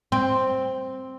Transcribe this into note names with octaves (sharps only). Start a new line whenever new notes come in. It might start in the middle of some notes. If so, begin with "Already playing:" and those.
C4